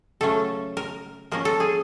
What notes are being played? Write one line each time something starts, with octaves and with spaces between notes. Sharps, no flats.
C#3 F#3 A3 C#4 A4
A#4
F3 A#3 C#4 A#4
A4
G#4